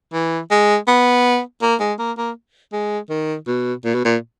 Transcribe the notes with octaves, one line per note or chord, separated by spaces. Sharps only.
E3
G#3
B3
A#3
G#3
A#3
A#3
G#3
D#3
B2
A#2
B2
A#2